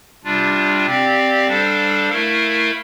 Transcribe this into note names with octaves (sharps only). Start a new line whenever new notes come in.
C3 G3 D4 F4
C4 G4 D5 F5
G3 D4 A4 C5 F5
A3 E4 A#4 F5